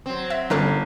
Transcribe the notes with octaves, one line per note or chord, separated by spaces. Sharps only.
F#3 C4
E5
G1 C#4 D4 A4